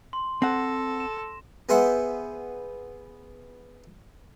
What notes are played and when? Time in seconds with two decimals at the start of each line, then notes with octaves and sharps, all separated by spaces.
0.13 C6
0.42 C4 A4 F#5 A#6
1.00 E7
1.69 B3 G#4 C5 E5 F#5